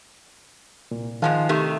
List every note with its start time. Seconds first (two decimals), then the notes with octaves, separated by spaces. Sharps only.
0.91 C2 A#2
1.22 G#2 D#3 F3 G#3 F5 A5
1.49 C3 D#3 A3 G4